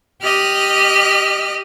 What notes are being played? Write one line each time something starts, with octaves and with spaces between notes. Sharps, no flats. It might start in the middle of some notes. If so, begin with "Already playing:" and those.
G4 D#5 F6 F#6